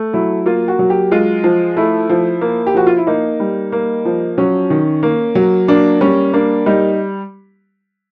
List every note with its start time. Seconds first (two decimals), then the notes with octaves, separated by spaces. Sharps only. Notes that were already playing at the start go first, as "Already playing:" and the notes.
Already playing: A3
0.13 F#3 E4
0.46 A#3 F4
0.68 F#4
0.79 F#3
0.90 G4
1.11 G#3 F4
1.44 F3
1.76 A3 E4
2.09 F3
2.41 A#3
2.67 G4
2.74 F3 F#4
2.87 F4
2.97 E4
3.07 A#3 D#4
3.40 G3
3.72 A#3
4.05 F3
4.38 F#3 C#4
4.70 D#3
5.03 A#3
5.35 F#3
5.68 A#3 D4
6.01 G3 C#4
6.33 A#3 D4
6.66 G3 D#4